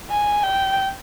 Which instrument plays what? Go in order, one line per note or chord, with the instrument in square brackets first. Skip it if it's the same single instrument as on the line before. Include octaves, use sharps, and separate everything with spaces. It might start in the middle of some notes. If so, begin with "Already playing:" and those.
[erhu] G#5
G5